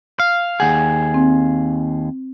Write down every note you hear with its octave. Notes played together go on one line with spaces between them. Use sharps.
F5
D#2 G#4 F#5 G6
C4